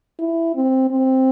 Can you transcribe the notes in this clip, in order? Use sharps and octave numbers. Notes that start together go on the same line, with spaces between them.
E4
C4
C4